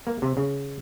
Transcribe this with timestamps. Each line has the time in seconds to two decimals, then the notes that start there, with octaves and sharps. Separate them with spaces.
0.07 A#3
0.22 C3
0.37 C#3